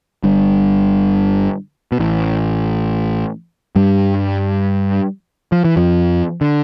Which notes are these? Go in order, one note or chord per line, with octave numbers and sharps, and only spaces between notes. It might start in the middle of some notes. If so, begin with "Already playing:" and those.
G1 G2
B2
A1 A2
G2 G3
F3
E3
F2 F3
D3